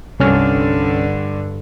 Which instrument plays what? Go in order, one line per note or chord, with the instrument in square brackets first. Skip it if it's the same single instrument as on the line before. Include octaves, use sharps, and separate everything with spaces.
[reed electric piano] C2 C#4 F6 [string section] G2 D3